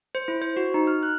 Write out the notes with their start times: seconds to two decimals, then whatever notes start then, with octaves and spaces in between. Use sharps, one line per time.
0.15 C5
0.28 E4
0.42 C5
0.56 F#4
0.74 D#4
0.87 F6
1.03 F#6